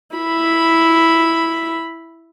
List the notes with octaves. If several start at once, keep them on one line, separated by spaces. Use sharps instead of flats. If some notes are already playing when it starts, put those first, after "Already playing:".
E4 B5